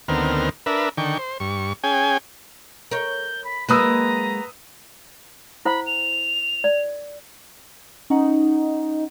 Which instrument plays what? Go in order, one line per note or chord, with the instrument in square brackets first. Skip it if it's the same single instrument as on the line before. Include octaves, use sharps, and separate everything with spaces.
[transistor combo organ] D2 D#3 B3 C4 A#4 F6
D4 A#4 B4 E5
D3 D#3 G5 C#6
C5
G2 C#6
C#4 G#4 G5 G#5
[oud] A#4 C#5 [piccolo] G6
[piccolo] B5
[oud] F#3 G#3 A#3 [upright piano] B4 D#6 E6 [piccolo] A#5
[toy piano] E4 C5 F#5 [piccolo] B5
[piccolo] F7
[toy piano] D5
[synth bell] C#4 F#5 [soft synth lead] D#4